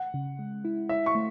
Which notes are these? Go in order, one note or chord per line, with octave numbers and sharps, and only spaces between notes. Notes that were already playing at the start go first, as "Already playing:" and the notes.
Already playing: F#5
C#3
G#3
E4
E4 E5
C#6
A3